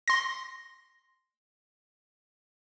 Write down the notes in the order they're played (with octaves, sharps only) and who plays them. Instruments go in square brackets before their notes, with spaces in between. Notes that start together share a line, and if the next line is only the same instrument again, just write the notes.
[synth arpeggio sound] C6 A#6